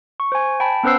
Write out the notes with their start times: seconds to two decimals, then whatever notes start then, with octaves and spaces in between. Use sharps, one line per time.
0.20 C#6
0.32 C5 G#5
0.60 G5 A5 B5
0.83 B3 C#4 B4 C5 E6 C7